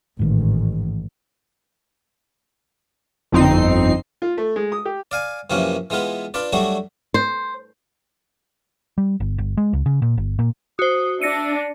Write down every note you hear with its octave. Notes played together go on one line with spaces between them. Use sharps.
A1 G#2 D#3
G1 F2 C4 D#4 C7
F4
A3
G#3
D#6
G4
D5 F5 G#5
F#2 C3 E3 F3 A#3 C#4
E3 G#3 B3 F4 B4
D4 F4 B4 D5
F#3 G3 A3 D4 F#4
C5
G3
G1
G1
G#3
C#2
C#3
A#2
G1
A#2
F#4 C5 D#6
D4 E5 A#6 C#7 D#7